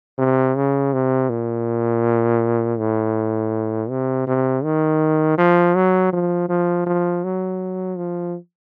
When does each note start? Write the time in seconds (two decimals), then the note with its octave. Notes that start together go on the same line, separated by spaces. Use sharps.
0.19 C3
0.56 C#3
0.93 C3
1.30 A#2
2.78 A2
3.89 C3
4.27 C3
4.64 D#3
5.38 F3
5.75 F#3
6.13 F3
6.49 F3
6.86 F3
7.24 F#3
7.97 F3